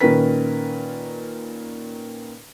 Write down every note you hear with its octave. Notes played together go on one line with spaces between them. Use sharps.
A#2 D#3 C#4 A#4 B4 B6